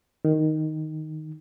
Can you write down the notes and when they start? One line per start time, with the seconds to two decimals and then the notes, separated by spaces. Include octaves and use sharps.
0.25 D#3